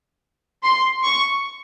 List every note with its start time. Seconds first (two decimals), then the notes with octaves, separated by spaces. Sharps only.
0.63 C6
1.04 C#6